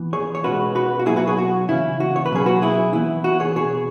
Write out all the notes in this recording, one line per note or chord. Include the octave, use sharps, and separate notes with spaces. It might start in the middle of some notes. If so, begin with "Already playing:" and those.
Already playing: E3 B3
G#4 C#5
C#5
B2 G#3 C#4 F#4 B4
F#4 B4
F#4
B2 F#3 B3 E4 G#4
F#4 B4
G#4 C#5
F#4
C#3 E3 C#4 E4
F#4
C#5
B4
B2 F#3 C#4 G#4
F#4 B4
E4 G#4
E3 B3 E4
F#4
G#4 C#5
B2 B3 G#4 C#5